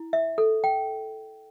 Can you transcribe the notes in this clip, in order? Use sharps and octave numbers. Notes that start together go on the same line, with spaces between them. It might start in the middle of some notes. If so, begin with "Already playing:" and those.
Already playing: E4
E5
A4
G5